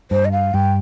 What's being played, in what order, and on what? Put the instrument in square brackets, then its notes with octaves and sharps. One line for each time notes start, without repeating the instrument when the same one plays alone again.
[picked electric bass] G2 [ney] C5
[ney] D#5
F5
[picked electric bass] G2 [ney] G5